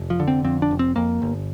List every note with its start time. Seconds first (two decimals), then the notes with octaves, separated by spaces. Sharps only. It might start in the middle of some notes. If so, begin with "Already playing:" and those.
Already playing: F1
0.10 F3
0.20 D3
0.28 C4
0.44 F2 C4
0.62 D4
0.71 F1
0.79 C4
0.96 F2 A#3
1.22 G1